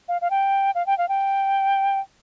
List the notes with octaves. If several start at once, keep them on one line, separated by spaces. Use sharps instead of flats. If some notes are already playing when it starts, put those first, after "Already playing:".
F5
F5
G5
F5
G5
F5
G5